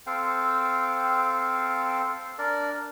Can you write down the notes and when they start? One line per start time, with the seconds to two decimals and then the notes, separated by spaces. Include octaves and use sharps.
0.07 C4 A4 F5 G5
2.38 D4 A#4 D5